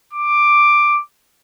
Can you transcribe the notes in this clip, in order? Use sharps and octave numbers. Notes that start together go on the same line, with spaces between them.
D6